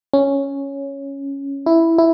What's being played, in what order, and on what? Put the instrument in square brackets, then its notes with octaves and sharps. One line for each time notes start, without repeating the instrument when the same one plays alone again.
[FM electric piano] C#4
E4
E4